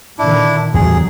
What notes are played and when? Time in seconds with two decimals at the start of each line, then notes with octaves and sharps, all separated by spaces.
0.19 A#2 D3 D#3 D4 E4
0.74 E2 A2 D3 F#3 G3 G#4